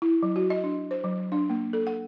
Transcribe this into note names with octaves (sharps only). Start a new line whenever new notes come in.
E4
F#3
F#4
D#5
D4
C5
F#3
D4
A#3
A4
F#5